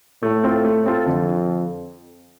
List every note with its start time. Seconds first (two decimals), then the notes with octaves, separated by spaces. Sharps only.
0.22 A2 A3
0.44 C4 F4 A4
0.65 A3
0.86 C4 F4 A4
1.06 F2 D3